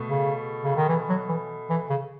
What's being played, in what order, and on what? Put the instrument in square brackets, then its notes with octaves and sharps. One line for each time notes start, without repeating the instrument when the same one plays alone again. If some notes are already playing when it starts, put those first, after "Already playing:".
Already playing: [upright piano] B2 A3
[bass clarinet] C#3
C#3
D#3
E3
F#3
E3
E3
C#3